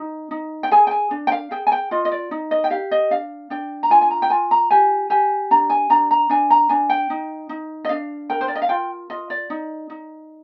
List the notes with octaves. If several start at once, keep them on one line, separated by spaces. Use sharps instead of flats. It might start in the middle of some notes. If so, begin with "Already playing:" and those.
Already playing: D#4
D#4
G5
G#4 G#5
G5
G#5
D4
G5
F5
G#4 G5
G#5
G5
F4 D#5
D#5
D5
D#4
D#5
G5
G4 F5
D#5
D4 F5
D4 G5
A#5
F4 G#5
G#5
A#5
G5
F4 G#5
A#5
G4 G#5
G4 G#5
D4 A#5
G#5
D4 A#5
A#5
D4 G#5
A#5
D4 G#5
G5
D#4
D#4
D#5
D4 F5
A#4 G5
C5
D5
D#5
F5
F4 G5
F4 D#5
D5
D#4
D#4